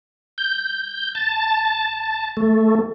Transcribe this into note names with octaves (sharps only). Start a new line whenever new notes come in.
G6
A5
A3